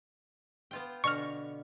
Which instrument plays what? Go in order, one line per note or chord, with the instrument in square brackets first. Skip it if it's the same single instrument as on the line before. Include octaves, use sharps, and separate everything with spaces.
[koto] B3 F4 G5
[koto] B2 D3 [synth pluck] C#6 F6